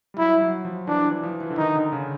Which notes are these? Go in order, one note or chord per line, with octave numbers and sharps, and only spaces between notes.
G3
F#3 E4
F#3
F3
E3 D4
E3
F3
E3
D3
D#3 D#4
D3
C#3